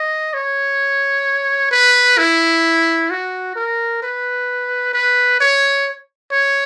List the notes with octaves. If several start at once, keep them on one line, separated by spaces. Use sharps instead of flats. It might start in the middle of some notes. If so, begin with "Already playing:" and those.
Already playing: D#5
C#5
B4
E4
F#4
A#4
B4
B4
C#5
C#5